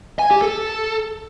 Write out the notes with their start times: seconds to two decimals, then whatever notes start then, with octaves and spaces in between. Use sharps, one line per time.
0.19 G#5
0.31 G4
0.42 A4